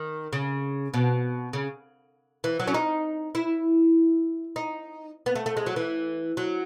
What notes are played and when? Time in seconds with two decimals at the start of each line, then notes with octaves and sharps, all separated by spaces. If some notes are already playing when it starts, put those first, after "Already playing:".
Already playing: D#3
0.33 C#3
0.94 B2
1.53 C#3
2.44 E3
2.60 F#3
2.67 C#4
2.74 D#4
3.35 E4
4.56 D#4
5.26 B3
5.35 A3
5.46 A3
5.57 G#3
5.66 F#3
5.76 E3
6.37 F#3